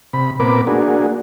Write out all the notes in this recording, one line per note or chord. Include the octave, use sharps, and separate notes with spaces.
C3 B5
A#2 B3 C4 A#4 B5 D6
A#3 D4 F#4 G#4